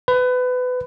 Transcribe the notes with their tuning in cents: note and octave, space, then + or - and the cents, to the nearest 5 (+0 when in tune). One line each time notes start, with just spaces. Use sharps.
B4 +25